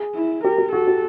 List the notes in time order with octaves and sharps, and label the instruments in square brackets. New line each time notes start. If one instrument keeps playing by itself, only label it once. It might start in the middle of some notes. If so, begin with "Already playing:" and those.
Already playing: [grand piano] G#4
[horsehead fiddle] E4
[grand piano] G4 [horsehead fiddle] A#4
[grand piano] G4
[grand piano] F#4 [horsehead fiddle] A4
[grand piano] G4